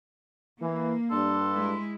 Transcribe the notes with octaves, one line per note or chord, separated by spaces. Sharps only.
E3 A#3
G2 D4 A4 C6
G#3 E4